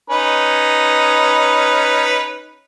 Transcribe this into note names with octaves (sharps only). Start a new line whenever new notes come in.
C#4 D#4 B4